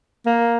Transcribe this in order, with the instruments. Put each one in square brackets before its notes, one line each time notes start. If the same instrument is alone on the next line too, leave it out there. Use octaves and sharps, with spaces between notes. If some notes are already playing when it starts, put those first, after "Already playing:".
[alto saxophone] A#3